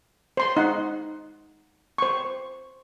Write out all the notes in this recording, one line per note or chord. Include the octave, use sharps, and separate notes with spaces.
C5 C6
D#4 F#5
C5 C#6